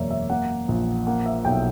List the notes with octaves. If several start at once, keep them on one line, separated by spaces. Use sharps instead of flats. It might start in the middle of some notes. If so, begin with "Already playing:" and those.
Already playing: E1 F#2 A#3 C#5 D5 E5
E5
A#3 F#5
A#1
A#3 F#5
E5
B1 G5